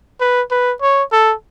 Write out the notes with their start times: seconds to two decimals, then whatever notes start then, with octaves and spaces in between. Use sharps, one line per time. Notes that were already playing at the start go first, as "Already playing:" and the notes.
0.21 B4
0.51 B4
0.82 C#5
1.12 A4